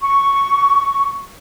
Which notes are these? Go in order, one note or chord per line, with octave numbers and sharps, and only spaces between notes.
C#6